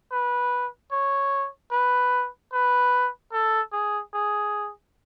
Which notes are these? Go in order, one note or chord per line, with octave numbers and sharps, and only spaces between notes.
B4
C#5
B4
B4
A4
G#4
G#4